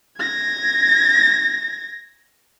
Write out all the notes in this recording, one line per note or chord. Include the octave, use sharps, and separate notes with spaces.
G#6 A#6